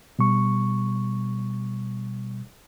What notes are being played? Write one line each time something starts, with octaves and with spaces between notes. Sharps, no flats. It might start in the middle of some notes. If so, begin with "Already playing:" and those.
B2 G3 C#6